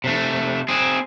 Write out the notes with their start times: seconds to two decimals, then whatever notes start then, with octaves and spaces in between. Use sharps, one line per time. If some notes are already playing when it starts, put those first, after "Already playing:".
0.04 C3 A3
0.68 C4 G#4